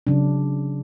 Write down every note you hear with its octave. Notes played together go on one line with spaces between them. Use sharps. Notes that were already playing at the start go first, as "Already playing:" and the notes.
C#3 F#3 D4